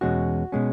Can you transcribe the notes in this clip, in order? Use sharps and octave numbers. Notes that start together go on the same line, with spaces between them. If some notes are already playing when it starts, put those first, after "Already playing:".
E2 B2 G#3 C#4 F#4
B2 G#3 C#4